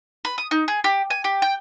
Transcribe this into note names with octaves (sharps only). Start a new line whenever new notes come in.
B4
D#6
D#4
G#4
G4
G#5
G4
G5